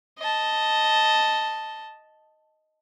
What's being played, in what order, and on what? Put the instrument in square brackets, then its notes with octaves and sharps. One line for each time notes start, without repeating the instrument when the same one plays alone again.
[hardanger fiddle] D#5 A5